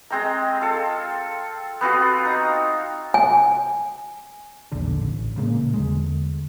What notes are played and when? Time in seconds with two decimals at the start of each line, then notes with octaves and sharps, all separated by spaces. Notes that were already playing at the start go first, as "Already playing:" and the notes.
0.10 G#3 C4 G5 A#5
0.61 F4 A4
1.81 B3 C4 F4 F#4
2.25 D#4 A#5
3.14 G#5
4.72 A#1 E2 D3 D4
5.01 A1
5.37 A#2 C#3 G#3 A#3
5.74 E2 D3 G#3